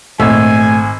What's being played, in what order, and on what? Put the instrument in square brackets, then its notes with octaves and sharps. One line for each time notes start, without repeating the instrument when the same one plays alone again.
[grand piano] G#1 E6 [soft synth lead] A#2 [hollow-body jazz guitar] A3 [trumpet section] G#5